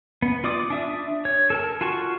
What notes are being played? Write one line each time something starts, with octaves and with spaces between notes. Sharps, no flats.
B3
F4 D5 D6 D#6
D4 E5 D#6
C#5
A4 A#4 A5
F4 F#4 A5 C#6